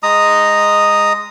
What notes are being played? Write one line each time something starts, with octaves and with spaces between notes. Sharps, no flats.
G#3 A#5 D#6